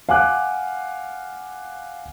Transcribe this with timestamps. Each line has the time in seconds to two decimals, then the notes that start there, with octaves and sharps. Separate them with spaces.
0.09 F5 F#5 G#5 D6 F#6